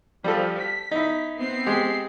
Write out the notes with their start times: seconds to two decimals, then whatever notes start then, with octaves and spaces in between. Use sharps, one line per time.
0.24 F3 G3 A4
0.58 B6
0.91 D#4 E4
1.38 B3 C4 C7
1.66 G#3 G4